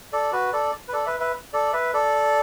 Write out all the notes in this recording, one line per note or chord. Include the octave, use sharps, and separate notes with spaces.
A4 D5
F#4 B4
A4 D5
B4
A4 D5
B4 E5
B4 E5
A4 D5
B4 E5
A4 D5